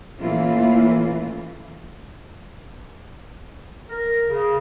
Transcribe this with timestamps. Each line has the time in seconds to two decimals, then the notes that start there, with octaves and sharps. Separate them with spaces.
0.19 A#2 E3 A3 A#3 C#4 F4
3.89 A#4
4.27 C#3